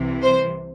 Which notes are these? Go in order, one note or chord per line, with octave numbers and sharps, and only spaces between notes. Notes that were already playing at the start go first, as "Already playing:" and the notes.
Already playing: C2 C3 E3
C5